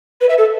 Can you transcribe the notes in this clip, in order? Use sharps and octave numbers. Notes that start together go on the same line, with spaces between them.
B4
E5
A4